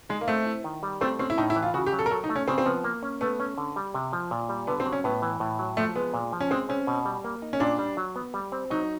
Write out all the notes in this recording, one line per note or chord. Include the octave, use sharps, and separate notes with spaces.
G#3 D#4
A#3
A3 C4
E4
D#3
G3
A3 C4
C4 C#4
E4
A2 D#4
E4
E3
F4
C#3 F#4
G4
F#3
A4
A#4
F#3 A4
D#4
A3
C#4
C#3 C4
C4
F3 B3
A#3
C#4
A3 B3
C#4
D3
G3
C3
F3
A#2
G3
D3 B3
C4
F#3
C#4
A2 B3
E3
A2
F#3
F3 A3
G#3 B3
A#2
F3
C#4
G#3 C4
C4 C#4
B2
G3
A#3
D#4
C#4
A#2 D4
G3
F#3
B3
G3
C4
F#3 D#4